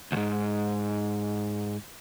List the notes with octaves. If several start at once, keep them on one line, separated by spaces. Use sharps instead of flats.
D2 G#2